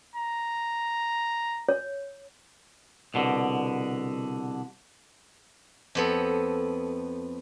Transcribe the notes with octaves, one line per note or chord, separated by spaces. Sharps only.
A#5
C#5
C2 B2 D3
F2 B3 A4